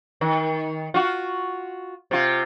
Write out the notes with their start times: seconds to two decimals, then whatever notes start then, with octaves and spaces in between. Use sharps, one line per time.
0.21 D#3
0.94 F4 F#4
2.11 C3 F4